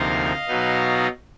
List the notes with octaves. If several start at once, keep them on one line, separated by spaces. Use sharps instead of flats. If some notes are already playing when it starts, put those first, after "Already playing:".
Already playing: D2 C3 F3 A#3 D#4 D#5 F5
B2 F#3 B3 D#4